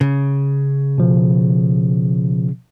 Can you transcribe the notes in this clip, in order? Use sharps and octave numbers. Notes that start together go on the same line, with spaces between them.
C#3
B2 F3